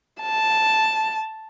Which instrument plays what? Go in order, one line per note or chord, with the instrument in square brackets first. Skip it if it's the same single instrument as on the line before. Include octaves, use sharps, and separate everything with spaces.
[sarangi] A5